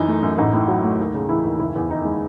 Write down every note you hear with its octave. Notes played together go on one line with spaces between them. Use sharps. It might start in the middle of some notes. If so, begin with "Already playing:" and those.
Already playing: F#2 E3 D#4
A3
F#2
A1 D#4
A2
F#3
A3
D#2
C#3
E3 E4
D#2
F#1 E4
E2
D#3 D#4
G#3